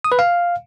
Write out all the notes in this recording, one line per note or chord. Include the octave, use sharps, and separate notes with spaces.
D#6
B4
F5